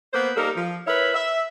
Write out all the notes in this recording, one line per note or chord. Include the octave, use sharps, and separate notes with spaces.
A#3 B3 B4 C5
G3 A#3 D#4 A4 A#4
F3
E4 A#4 B4 C#5 E5
E5